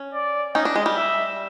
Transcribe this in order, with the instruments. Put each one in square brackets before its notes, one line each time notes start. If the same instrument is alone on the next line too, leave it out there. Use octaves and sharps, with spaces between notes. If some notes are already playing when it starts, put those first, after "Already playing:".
Already playing: [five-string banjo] C#4
[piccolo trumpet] D5
[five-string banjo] C#4 D#4 [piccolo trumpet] D#5
[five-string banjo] D4
G#3
G3
[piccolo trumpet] E5